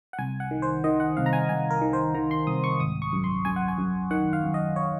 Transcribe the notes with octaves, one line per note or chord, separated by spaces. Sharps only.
F#5
C2 G#5
F#5
D#3
C5
D#3 D#5
F#5
C2 F5
A#5
G#5
C2 G#5
A#4
D#3
C5
D#3 A#5
C6
C2 D#6
C#6
G#1 D#6
C#6
F#2
C6
F#2 G#5
F#5
G#5
F#2
D#3 F#5
F5
F#2
D#5
C#5